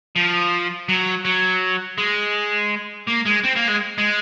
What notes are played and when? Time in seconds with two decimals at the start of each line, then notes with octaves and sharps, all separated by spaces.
0.16 F3
0.89 F#3
1.25 F#3
1.98 G#3
3.07 A#3
3.25 G#3
3.43 C4
3.56 A#3
3.67 G#3
3.98 G#3